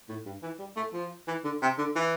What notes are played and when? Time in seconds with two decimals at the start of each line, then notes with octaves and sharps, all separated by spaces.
0.09 A2
0.26 G2
0.43 E3
0.59 G3
0.77 A3
0.94 F3
1.28 E3
1.44 D3
1.62 C3
1.78 D3
1.96 E3